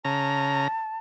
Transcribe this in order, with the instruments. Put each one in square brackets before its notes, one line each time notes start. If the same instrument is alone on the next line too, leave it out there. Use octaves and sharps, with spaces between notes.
[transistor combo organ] C#3 A#5 [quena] A5